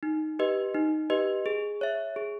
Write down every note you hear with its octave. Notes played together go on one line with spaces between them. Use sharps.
D#4
G4 B4 D#5
D#4
G4 B4 D#5
G#4
C#5 E5
G#4